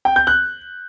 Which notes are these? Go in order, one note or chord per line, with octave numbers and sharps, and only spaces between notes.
G5
G6
F#6